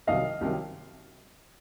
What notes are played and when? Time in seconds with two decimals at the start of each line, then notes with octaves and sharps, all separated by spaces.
0.07 C2 C3 D#3 F#3 D#5 F5
0.41 C2 C3 D#3 F#3